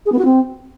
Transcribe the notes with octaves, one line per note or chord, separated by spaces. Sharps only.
G#4
B3
F#4
C4